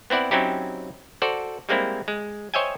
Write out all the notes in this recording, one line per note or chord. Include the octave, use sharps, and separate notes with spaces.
B3 C4 E4 D5 F#5
F#3 C4 C#4 D#4 E4 G4
F#4 A4 C5 D5
G3 G#3 A#3 C4 E4
G#3
C5 C#5 D#5 E5 G5 G#5